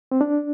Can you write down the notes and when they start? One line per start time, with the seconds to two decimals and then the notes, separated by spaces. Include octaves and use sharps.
0.12 C4
0.21 D4